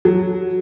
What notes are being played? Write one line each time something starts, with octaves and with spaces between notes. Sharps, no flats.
F#3